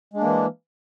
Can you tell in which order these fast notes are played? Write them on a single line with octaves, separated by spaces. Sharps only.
G#3 D4 A#3 E3